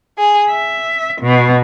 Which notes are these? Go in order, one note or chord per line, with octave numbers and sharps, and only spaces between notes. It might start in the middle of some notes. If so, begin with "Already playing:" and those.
G#4
E5
B2